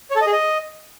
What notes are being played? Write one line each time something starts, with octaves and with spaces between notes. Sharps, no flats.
C#5
A4
D#5
G#4
D#5